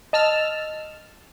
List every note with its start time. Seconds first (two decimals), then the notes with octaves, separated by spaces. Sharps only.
0.13 D#5 A5 E6 F6